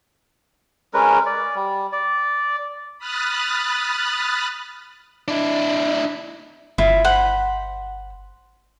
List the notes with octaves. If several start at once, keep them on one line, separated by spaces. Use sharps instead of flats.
G#3 C#4 A#4 B4
D5
G3
D5
B5 D#6 F6 F#6 A6
D4 E4
G1 E4 F4
C5 F#5 B5